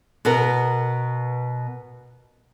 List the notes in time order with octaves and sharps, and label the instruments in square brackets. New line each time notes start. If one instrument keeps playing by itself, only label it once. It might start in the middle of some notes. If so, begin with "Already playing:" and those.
[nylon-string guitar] B2 B3 A#4